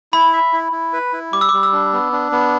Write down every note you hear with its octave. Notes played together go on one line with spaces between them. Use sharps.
E4 B5
E5
E4
E4
B4
E4
G3 D6
E6
G3 D6
E6
D4
B3
D4
B3